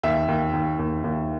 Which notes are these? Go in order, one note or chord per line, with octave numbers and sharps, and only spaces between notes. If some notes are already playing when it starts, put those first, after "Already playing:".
D#2 E5
D#2
D#2
D#2
D#2